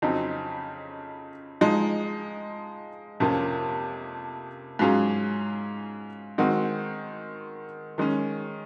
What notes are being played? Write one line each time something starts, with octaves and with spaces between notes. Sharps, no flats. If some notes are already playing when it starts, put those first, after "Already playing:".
F2 C#3 F#3 C4 D#4
F3 G#3 D#4
F2 C3 F3 A#3 C#4
G#2 F#3 C#4 F4 G#4
D#3 G#3 C4 F#4
D#3 G#3 C#4